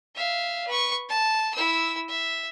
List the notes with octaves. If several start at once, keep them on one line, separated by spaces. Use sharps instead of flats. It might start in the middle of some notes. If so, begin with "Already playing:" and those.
E5 F5
B4 C#6
A5
E4 E6
E5